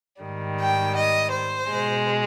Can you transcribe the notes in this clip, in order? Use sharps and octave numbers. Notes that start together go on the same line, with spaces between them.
G#2 D#3 G3
G5
D#5
C5
B2 G#3